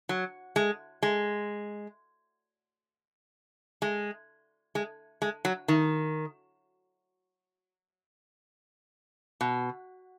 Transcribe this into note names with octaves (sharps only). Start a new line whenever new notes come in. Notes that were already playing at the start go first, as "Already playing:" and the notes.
F#3
G#3
G#3
G#3
G#3
G#3
F#3
D#3
B2